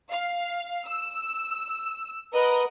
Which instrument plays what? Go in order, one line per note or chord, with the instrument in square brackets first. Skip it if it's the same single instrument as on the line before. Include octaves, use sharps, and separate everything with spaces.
[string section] F5
E6
[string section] A#4 D#5 F#5 [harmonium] B4